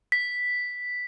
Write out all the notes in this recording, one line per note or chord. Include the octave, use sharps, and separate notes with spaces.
B6